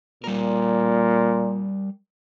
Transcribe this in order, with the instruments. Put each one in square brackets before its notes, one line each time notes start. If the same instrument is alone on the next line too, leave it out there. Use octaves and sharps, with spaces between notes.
[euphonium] A#2 [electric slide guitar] G3 A#4